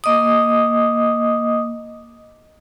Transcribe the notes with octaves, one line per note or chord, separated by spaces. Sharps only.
A#3 D#5 D6 D#6